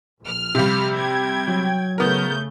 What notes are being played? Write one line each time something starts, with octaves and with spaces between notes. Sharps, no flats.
A#1 F6
C3 G3 G4 F5
G5 G#6
F#3
C#3 A3 B3 A#4 G6